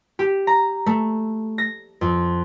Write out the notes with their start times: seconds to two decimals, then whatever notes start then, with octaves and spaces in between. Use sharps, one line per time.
0.19 G4
0.47 A#5
0.86 A3
1.58 A#6
2.01 F2